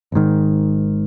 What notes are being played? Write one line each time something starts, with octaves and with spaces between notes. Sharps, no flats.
G#1 G#2 D#3